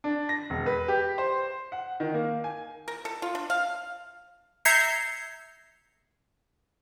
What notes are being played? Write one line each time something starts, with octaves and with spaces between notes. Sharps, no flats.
D4
A#6
E1
B4
G4
C5
F#5
D#3
A#3
G#5
A#4
A4
F4
D4
F5
E5 A#5 G6 G#6 C7 C#7